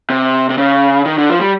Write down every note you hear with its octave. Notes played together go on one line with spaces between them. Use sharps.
C3
C3
C#3
D#3
D3
F3
G3